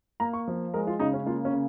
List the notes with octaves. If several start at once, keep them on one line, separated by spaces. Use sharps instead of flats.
A#3 A#5
C#6
F3
G#3 A#4
F4
C#3 D#4
C#4
A#3 F4
C#4
C#3